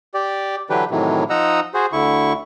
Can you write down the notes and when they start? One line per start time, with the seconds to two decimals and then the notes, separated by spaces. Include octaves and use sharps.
0.14 G4 D5
0.70 D3 E3 F#3 D4 G4 B4
0.91 A2 C3 D#3 E3 F#3
1.30 F3 D#4 D#5 F#5 A#5 E6
1.74 F#4 G#4 C5
1.92 D2 D3 E4 C#6